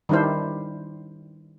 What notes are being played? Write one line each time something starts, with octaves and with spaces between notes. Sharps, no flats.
D#3 G3 D4 E4 C5